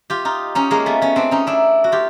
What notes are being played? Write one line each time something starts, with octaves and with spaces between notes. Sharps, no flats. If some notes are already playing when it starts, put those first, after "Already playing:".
F4 G4
D#4 F4
C#4 D#4
G#3 A#3
A3 B3
B3 C#4
C4 D4
C#4 D#4
D4 E4
F#4
F4 G4